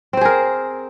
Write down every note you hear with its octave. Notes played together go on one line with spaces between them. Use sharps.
C4 G#4 A#4 C5